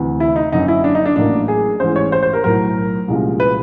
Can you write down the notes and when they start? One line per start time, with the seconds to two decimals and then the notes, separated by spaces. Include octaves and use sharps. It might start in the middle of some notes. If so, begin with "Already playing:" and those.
Already playing: D2 C3 E3
0.20 E4
0.36 D#4
0.52 F#1 F#2 D3 D#4
0.68 E4
0.84 D4
0.95 D#4
1.06 D4
1.16 A1 A2 F#3 A#3 C#4 D4
1.48 G#4
1.80 A1 G#2 E3 G#3 C#4 C5
1.96 C#5
2.12 C5
2.23 C5
2.33 A#4
2.44 B1 A2 F#3 A#4
3.08 C2 A#2 F3 G#3 C#4
3.40 B4